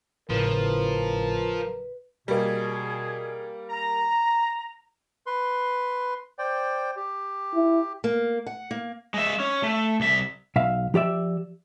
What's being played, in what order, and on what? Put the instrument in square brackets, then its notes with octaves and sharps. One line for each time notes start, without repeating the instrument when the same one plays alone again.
[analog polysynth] G#1 A2 C#3 [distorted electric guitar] F3 [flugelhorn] A#4 [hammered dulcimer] B4
[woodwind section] B2 G#4 [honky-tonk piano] G3 A#3
[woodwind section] A#5
[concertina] B4 C6
C5 D5 G5
G4
[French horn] E4
[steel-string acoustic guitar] A#3
F#5
A#3
[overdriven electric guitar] G#3 E5
C#4
A3
C2 E5
[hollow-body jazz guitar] B1 E5 F5
F3 G4 D5 E5